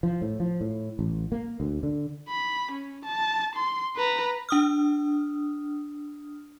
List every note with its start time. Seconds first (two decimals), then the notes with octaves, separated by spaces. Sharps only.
0.03 F3
0.22 A2
0.40 F3
0.61 A2
0.99 A1
1.32 A#3
1.60 D2
1.83 D3
2.29 B5
2.72 C#4
3.05 A5
3.55 C6
3.97 B4 A#5
4.49 D4 D#6 F6